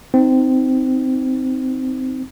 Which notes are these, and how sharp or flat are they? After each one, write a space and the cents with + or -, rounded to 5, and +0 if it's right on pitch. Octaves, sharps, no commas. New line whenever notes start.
C4 -15 D#4 +0